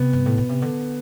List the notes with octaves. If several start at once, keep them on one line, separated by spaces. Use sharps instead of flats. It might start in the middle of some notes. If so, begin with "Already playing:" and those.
Already playing: C3 B3
G2
A2
B2
C3
D3